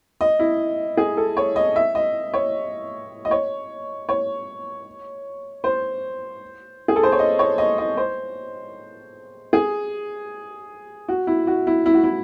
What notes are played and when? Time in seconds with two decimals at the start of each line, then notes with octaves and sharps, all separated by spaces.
0.21 D#5
0.39 E4
0.97 G#4
1.17 A4
1.37 C#5
1.56 D#5
1.76 E5
1.95 D#5
2.33 C#5
3.25 D#5
3.31 C#5
4.09 C#5
5.64 C5
6.88 G#4
6.96 A4
7.03 C5
7.12 C#5
7.19 D#5
7.39 C#5
7.58 D#5
7.78 D#5
7.97 C5
9.53 G#4
11.08 F#4
11.27 E4
11.47 F#4
11.67 E4
11.86 E4
11.94 F#4
12.04 E4